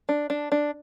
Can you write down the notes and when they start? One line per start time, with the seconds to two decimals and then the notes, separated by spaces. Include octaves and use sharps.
0.09 D4
0.30 D4
0.52 D4